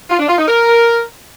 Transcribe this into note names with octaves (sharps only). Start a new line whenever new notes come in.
F4
D4
F4
D#4
A#4